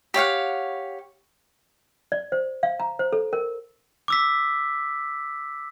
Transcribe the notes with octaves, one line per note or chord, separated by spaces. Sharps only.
G4 C#5 F5 F#5
D5
C5
F5
A#5
C5
A4
A#4
D6 E6 B6